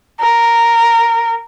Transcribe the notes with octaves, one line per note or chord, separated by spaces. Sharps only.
A#4